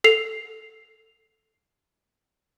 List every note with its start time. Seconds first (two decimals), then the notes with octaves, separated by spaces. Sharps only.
0.04 A4 C7 F7